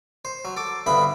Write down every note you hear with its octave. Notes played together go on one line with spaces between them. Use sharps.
C5
F#3
A4 D6
D2 G2 B3 E5 B5